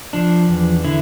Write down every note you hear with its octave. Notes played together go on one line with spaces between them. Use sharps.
F3 D4
E2
D3 E4